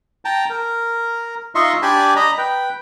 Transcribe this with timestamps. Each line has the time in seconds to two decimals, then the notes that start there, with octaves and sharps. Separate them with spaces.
0.25 G5 A5 A#5
0.50 A#4
1.55 D#4 F4 D#5 E5 C6 C#6
1.82 D4 G4 D5 G#5 A5 B5
2.16 D#5 A#5 B5
2.38 B4 G5